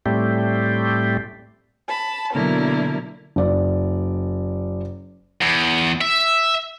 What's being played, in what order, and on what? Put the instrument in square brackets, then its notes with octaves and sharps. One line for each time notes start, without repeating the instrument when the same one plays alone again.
[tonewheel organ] A2 G3 A3 C4 G4
[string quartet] A5 B5
B2 D3 F#3 A#3 E4 A#4
[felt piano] F#1 D5
[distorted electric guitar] E2
E5